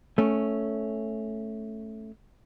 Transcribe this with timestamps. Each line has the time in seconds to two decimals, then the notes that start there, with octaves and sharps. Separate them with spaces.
0.18 A3 C#4